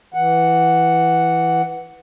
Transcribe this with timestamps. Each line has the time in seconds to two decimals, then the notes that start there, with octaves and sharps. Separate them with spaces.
0.14 E3 F#5